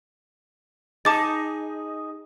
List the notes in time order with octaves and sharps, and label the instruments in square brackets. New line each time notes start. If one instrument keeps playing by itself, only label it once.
[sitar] D#4 G#4 [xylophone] A5 D6 A6